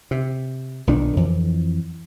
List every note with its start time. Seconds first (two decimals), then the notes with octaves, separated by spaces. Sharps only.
0.11 C3
0.87 B1 A#2 D#3 D4
1.17 F2 E3